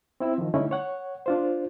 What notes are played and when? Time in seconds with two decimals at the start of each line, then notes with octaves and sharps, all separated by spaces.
0.20 C4 E4 E6
0.38 D#3 F3
0.54 D3 G3 A3 C#4 D#4 E4
0.71 C#5 F#5
1.26 D4 F4 C5